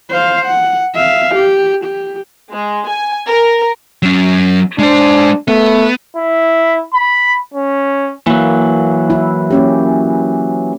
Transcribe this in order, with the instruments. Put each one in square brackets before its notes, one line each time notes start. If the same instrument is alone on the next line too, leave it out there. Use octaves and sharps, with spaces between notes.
[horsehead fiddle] C5 F5
F#5
E5 F5
G4
G4
[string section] G#3
G#5
A#4
[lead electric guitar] F#3 C#4
[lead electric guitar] G#3 C5 [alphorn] D4
[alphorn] A3 [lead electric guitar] B3
[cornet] E4
B5
C#4
[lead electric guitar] E3 F#3 [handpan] A#3
[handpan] E4
A#3 C#4 G4